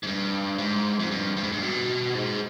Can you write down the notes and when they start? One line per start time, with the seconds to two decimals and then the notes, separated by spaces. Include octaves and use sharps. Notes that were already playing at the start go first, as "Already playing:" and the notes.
0.03 G#2
0.07 G2
0.59 G#2
0.99 F2
1.11 G2
1.37 G2
1.44 G#2
1.52 G2
1.63 B2
2.15 G#2